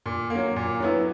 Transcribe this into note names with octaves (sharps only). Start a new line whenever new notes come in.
A#2
A#3
F#3
A#2
F#3 B3 E4